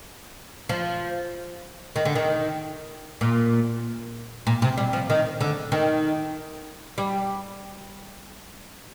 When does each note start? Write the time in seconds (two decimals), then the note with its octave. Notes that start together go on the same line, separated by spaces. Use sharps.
0.69 F3
1.96 D#3
2.05 D3
2.15 D#3
3.21 A#2
4.47 A#2
4.62 C3
4.78 G3
4.93 F3
5.10 D#3
5.41 D3
5.72 D#3
6.98 G3